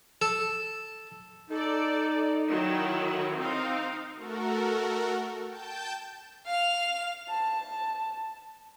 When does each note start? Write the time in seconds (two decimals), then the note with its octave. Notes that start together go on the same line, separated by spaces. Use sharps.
0.22 A4
1.50 D#4 A4 D5
2.49 D#3 F#3 E4
3.39 C4 D#4 F5
4.14 A3 F#4 A4 A#4
5.47 G5 A5 G6
6.46 F5 F7
7.29 A5